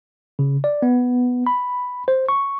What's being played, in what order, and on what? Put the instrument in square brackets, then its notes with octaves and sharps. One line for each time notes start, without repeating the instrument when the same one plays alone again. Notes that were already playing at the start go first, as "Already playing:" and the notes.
[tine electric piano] C#3
D5
B3
B5
C5
C#6